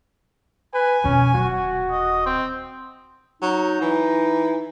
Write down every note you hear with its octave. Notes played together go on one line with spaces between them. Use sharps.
B4 G#5
F2 B2 C#4
D#1 F#3 F#4
D#5
C4
F#3 D#4
E3